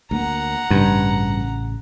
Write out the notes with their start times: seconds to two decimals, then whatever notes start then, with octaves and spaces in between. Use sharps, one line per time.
0.11 D2 G#3 A#3 F#5 A#5
0.70 A1 G2 C#3